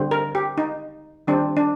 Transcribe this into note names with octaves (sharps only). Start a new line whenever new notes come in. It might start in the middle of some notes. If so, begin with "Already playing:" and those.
Already playing: D3 G3 C4
A#4
G4
D#4
D#3 G3 C4 D4
D4